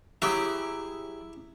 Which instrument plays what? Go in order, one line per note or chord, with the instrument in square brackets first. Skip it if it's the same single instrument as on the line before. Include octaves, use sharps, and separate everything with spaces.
[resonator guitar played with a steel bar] F#3 G4 G#4 [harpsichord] E4